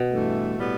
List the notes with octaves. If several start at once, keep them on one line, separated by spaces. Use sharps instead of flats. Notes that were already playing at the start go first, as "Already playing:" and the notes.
Already playing: B2
G2 E3 A3
A2 G3 B3